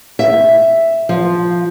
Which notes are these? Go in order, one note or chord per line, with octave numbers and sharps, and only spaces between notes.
E5
F3